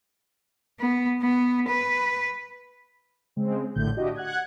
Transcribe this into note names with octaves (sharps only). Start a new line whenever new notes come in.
B3
B3
B4
C#3 G#3 C4
A#1 A2 D3 G6
D4 E4 F#4 G4 D#5
F#5 F#6 G#6